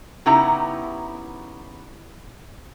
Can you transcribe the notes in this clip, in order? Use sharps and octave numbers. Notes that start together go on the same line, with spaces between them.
C#3 B3 D#4 E4 G4 A#5